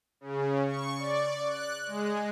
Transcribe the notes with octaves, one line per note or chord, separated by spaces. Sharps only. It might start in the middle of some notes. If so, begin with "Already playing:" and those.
C#3
C#6
D5
F#6
G#3